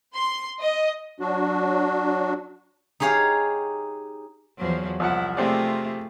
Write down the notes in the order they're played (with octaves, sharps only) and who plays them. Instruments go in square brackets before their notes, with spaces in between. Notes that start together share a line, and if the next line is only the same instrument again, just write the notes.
[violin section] C6
D#5
[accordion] F#3 D4 F#4
[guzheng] D#4 G4 G#4 C#5 F5
[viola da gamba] E2 F3 F#3
[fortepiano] C2 F3 F#5 [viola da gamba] E4
[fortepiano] C3 C4 D5 [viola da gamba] A3 F4 G#4